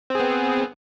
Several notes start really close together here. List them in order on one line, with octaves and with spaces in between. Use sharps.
C4 G#4 B3